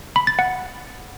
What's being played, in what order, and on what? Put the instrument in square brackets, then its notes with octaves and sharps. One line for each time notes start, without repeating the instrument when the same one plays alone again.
[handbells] B5
A6
F#5